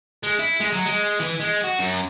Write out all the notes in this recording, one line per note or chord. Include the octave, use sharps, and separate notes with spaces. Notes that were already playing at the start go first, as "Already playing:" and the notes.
G#3
E4
G#3
F#3
G#3
E3
G#3
F#4
F#2